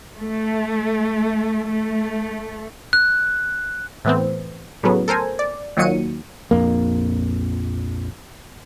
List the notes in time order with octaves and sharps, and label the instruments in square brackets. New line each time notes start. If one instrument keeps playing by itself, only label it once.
[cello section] A3
A3
[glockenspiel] F#6
[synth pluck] A2 E3 B3 C4
A2 C#3 F#3 B3
A4 A#4 C5 G#5
D5
D#2 A#2 D#3 F#3 C#7 D#7
[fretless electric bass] A#1 F2 A#3